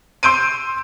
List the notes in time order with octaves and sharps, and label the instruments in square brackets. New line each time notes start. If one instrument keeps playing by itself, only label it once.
[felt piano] C6 E6 G6 D7 D#7